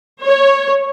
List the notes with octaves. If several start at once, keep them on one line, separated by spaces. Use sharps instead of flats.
C#5